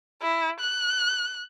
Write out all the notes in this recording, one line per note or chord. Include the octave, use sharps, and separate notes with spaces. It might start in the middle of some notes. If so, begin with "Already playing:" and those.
E4
F#6